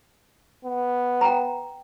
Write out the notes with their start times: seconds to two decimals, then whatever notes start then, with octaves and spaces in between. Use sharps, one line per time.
0.65 B3
1.21 G5 A#5